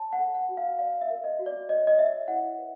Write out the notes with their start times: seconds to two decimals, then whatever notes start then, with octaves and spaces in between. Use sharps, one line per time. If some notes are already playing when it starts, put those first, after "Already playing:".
Already playing: C#5 A5
0.13 F#5
0.19 A4
0.35 F#5
0.49 F#4
0.57 F5
0.79 D5 F5
1.01 E5
1.10 A#4
1.24 D#5
1.39 F#4
1.46 D5
1.69 C#5 D#5
1.87 D#5
1.98 C#5 E5
2.28 E4 F#5
2.58 B4